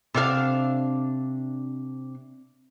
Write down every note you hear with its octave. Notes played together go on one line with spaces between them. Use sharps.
C3 D4 F5